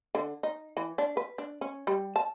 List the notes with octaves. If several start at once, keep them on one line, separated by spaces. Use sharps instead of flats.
D3
D#4
E3
D4
B4
D4
C#4
G3
A5